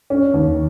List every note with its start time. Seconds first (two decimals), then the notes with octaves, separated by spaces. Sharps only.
0.10 C#4
0.34 D#2